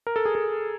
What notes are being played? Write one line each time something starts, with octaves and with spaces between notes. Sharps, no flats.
A#4
A4
G#4
A4